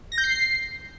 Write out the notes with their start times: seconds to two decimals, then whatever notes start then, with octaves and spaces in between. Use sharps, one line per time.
0.12 A#6
0.18 G6
0.24 C7